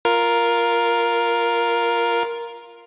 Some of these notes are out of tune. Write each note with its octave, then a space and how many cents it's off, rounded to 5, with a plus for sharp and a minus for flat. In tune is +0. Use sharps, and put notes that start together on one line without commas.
F4 -5 A#4 +5